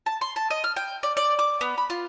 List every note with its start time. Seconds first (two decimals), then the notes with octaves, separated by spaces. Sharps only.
0.06 A5
0.21 C6
0.36 A5
0.50 D#5
0.64 F6
0.76 G5
1.03 D5
1.17 D5
1.39 D6
1.61 B3
1.78 B5
1.90 F4